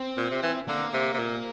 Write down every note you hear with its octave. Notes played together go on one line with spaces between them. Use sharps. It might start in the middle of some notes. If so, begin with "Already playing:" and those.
Already playing: C4
A#2
C3
E3
D3 A#3
C3
C3
A#2